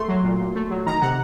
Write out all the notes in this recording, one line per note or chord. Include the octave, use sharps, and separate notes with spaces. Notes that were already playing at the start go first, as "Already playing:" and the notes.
Already playing: A3 C6
F#3
A#2
A#2
A3
F#3
D#3 A#5
C3 F#5